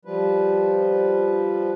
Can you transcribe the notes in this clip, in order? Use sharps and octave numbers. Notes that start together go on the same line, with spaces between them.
F3 G3 B4